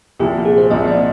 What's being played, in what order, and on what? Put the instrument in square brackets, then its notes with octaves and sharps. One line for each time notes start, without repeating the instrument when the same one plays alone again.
[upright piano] C2 A#2 F3 [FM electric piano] G4
[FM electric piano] G#4
C5
[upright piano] C2 A#2 F3 [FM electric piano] D#5
[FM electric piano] D5